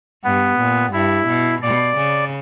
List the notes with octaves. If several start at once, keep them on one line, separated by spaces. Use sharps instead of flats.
G2 B3
A#2
G2 E4
B2
B2 D5
C#3